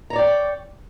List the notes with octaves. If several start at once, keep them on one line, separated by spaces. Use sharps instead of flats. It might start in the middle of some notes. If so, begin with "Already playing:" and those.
C#5 D5 G5 A#5